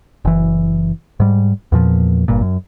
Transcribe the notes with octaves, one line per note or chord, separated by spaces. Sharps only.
F#1 E3
G#2 G3
E2 A#2 F3
G1 G2 A#2
F#2